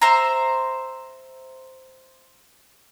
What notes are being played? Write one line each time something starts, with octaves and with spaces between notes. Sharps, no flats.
C5 E5 A#5